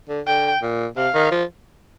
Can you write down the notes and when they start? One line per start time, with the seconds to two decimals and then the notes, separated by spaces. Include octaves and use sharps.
0.09 D3
0.26 D3 G5
0.62 A#2
0.96 C3 F5
1.14 D#3
1.31 F3